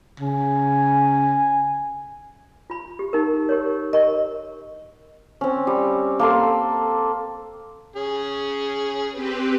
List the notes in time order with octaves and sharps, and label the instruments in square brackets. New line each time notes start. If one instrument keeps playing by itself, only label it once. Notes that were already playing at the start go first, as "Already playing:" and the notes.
[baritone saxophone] C#3 [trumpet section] G#5
[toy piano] F4 B5
G4
D#4 A#4
G4 A#4 C#5
[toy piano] A#4 C#6 [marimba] D#5
[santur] C4 C#4
G3
A#3 A4 C6
[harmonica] C#4 G#4
[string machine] C4 G4 B4